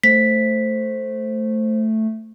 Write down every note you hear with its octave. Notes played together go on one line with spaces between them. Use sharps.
A3 C5 B6